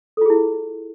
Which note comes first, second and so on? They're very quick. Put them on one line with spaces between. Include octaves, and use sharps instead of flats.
A4 F4 G#4 E4